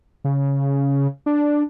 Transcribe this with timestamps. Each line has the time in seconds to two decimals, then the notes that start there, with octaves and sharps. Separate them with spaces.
0.25 C#3
1.26 D4